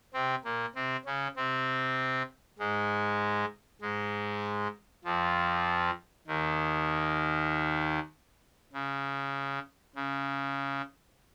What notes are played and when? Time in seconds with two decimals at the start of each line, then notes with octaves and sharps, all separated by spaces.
0.14 C3 C4
0.44 A#2 A#3
0.75 C3 C4
1.06 C#3 C#4
1.37 C3 C4
2.59 G#2 G#3
3.81 G#2 G#3
5.05 F2 F3
6.27 D#2 D#3
8.73 C#3
9.95 C#3